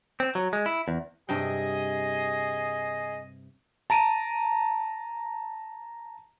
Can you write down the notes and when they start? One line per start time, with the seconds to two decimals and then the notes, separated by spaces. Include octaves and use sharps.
0.20 C4
0.35 F#3
0.53 G#3
0.66 E4
0.88 E2
1.29 G2 C3 G#4 D#5 G5
3.90 A5 A#5 D7 D#7